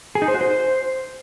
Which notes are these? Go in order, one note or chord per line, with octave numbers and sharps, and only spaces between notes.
G#4
D#4
C5
F#4
C5